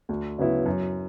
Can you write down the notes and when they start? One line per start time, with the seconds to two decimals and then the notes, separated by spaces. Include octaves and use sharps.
0.09 D2
0.38 C#3 F#3 B3 E4
0.66 F#2